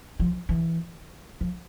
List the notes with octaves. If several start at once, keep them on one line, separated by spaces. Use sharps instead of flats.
F3
E3
F3